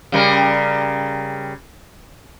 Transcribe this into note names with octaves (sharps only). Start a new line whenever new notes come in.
C#3 G3 A#4